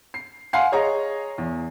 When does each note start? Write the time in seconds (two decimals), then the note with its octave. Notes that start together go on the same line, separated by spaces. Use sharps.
0.14 C7
0.53 F5 F#5 G#5 C6 C7
0.72 G#4 C#5 D#5 A#5
1.38 E2